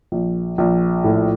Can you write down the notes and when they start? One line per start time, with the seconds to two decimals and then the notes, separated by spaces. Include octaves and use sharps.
0.12 A#1
0.58 A#1
1.04 A2